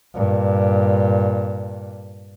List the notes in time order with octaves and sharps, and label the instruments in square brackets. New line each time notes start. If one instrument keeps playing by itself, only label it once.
[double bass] G2 A#2